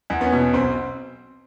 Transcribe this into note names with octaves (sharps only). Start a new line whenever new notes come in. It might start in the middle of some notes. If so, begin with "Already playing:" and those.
E2
B3 C#4
B2
B1 C4